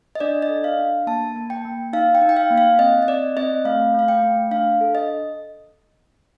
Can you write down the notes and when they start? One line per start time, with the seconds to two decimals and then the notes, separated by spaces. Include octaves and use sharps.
0.15 D#5
0.20 D4 D5
0.42 D#5
0.49 A4
0.64 F5
0.79 D4
1.07 A#3 A5
1.36 A#3
1.50 G5
1.65 A#3
1.93 D#4 F5
2.15 G5
2.22 D#4
2.29 G5
2.37 F5
2.51 A#3
2.58 F5
2.79 C4 D#5
3.02 D#5
3.08 C4 D5
3.37 C4 D#5
3.65 A3 F5
3.94 A3 F5
4.08 G5
4.22 A3
4.51 D4 F5
4.81 A4
4.95 D#5